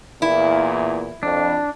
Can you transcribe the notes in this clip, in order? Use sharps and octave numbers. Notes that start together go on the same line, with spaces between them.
E2 A#2 E4
F2 D4